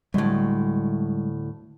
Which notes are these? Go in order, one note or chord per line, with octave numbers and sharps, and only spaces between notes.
D2 A2 G3 G#3